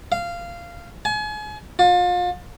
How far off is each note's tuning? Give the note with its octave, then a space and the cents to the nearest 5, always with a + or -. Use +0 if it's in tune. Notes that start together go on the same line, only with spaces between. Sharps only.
F5 -15
G#5 +35
F4 +35